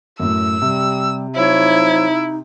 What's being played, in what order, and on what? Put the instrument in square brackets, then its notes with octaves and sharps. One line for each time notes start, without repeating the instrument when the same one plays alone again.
[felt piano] F#2 A2 [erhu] E6
[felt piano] C3 [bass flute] G3
[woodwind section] F3 F#3 C#5 [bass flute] D#4 [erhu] E4